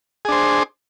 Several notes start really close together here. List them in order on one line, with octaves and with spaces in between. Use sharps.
G#4 D4 C5